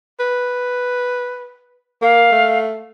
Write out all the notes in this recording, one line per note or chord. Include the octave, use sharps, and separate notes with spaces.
B4
A#3 F5
A3